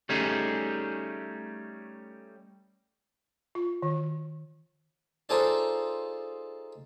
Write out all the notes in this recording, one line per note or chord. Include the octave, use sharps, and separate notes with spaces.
G3 A3 C#4 D#4 G4 G#4
F4
D#3
D#4 F4 G#4 A4 C5 D5